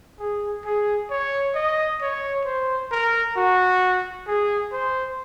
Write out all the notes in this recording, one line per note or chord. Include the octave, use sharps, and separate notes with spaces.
G#4
G#4
C#5
D#5
C#5
C5
A#4
F#4
G#4
C5